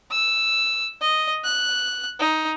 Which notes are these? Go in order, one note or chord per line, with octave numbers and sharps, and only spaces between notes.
E6
D#5
F#6
D#4